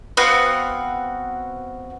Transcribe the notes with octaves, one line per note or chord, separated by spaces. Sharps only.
B3 C4 F#4 F5